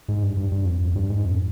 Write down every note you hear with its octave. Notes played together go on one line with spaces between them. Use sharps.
G#2
G2
G2
G2
F2
F2
G2
G#2
F2